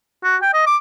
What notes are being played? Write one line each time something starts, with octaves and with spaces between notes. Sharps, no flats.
F#4
G5
D#5
D6